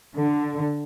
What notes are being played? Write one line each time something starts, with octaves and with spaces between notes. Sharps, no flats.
D3